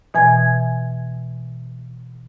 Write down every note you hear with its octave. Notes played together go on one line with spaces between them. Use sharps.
B2 E3 G#5 G#6